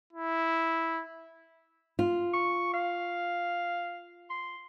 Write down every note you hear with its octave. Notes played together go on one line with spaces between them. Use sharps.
E4
F4
C#6
F5
C6